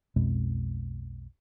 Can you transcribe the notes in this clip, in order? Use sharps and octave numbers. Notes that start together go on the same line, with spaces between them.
B1 F2 B2 G#3